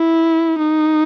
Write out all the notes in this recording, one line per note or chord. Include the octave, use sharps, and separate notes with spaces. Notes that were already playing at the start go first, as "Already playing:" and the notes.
Already playing: E4
D#4